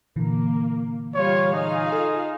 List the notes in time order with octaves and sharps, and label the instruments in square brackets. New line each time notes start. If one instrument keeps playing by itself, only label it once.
[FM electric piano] A#2 D3 E3 [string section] A#3
[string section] G3 F4 F5 [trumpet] C#5
[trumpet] D#4 [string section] F4 G#4 F5
[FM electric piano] A4 D#5